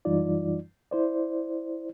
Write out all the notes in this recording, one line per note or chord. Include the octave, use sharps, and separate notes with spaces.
F#2 E3 G3 D#4 F4 D5
E4 C5 D5